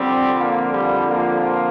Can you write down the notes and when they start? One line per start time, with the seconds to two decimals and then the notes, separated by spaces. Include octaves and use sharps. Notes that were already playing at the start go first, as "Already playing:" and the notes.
Already playing: F2 D3 G3 C4
0.38 F3 A#3
0.74 G3
1.08 F3 A#3